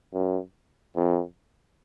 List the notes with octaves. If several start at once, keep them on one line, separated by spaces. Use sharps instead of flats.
F#2
F2